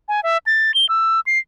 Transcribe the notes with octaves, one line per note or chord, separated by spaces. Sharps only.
G#5
E5
A6
G7
E6
C7